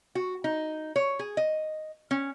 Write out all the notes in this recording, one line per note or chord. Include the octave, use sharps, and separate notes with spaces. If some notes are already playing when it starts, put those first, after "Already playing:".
F#4
D#4
C#5
G#4
D#5
C#4